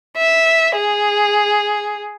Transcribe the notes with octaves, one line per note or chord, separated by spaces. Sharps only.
E5
G#4